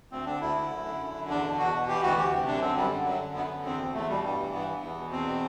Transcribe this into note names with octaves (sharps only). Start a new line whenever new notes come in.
D2 C4
D3 D4
D2 E4
D3
F#2
D3
F#2
D3
E2 D4
B2
E2 F#4
B2
E3 G4
D2 F#4
D2 G4
C3
F#2 D4
D3 C4
F#2 G3
D3
F#2 F#3
D3
F#2 B3
D3
E2 C4
B2
E2 A3
B2 G3
G2 G3
E3
G2 B3
E3
E2
B2
E2 C4
B2